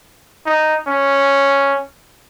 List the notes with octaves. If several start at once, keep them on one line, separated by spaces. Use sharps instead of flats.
D#4
C#4